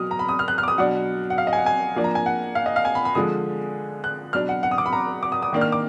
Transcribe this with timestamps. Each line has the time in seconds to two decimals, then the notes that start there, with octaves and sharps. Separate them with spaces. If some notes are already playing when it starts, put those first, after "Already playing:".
Already playing: B2 F#3 D#6 F6
0.11 A#5
0.19 B5
0.29 D#6
0.39 F6
0.48 F#6
0.58 F6
0.63 D6
0.68 D#6
0.78 B2 F#3 D4 F#5
1.30 F#5
1.38 F5
1.47 D#5
1.53 G#5
1.57 F#5
1.66 G#5
1.96 F3 A#3 D4
2.04 A#5
2.15 G#5
2.26 F#5
2.55 F5
2.66 D#5
2.76 F5
2.85 G#5
2.95 B5
3.05 B5
3.15 D3 F3 G#3 D#6
4.04 F#6
4.33 B2 F#3 D4 F6
4.49 F#5
4.63 F#5
4.71 D#6
4.78 D6
4.86 B5
4.93 A#5
5.23 D6
5.32 D#6
5.42 D#6
5.53 D#3 A#3 D4
5.61 F6
5.72 D6